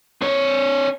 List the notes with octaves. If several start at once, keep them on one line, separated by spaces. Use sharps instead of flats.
C4 C#5